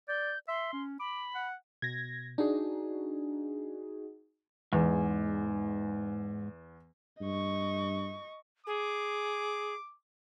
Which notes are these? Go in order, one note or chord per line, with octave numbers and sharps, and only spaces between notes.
D5 G6
E5 C6
C#4
B5 D6
F#5
B2 G#6 A#6
D4 D#4 F#4 G#4
E2 G#2
G2 D#5 C#6
G#4 D6